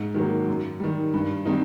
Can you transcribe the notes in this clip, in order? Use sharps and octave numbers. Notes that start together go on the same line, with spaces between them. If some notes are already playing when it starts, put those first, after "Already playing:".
Already playing: G#2
D#3 F#3 A#3
F#2
D#3 G3
G2
D#3 G3 C4 D#4